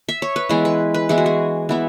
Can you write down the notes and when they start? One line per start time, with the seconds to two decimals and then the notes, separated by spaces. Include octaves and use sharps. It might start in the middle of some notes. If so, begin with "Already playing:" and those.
Already playing: F#5
0.09 E5
0.22 C#5
0.36 B4
0.49 E3 G#3 B3 E4 G#4
0.65 B4
0.94 B4
1.09 E3 G#3 B3 E4 G#4
1.18 F#4
1.26 G#4
1.69 E3 B3 E4